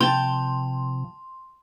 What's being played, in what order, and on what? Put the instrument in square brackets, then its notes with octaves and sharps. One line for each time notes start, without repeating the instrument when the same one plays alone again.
[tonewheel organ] C3 F3 [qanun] G5 A5 [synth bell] C6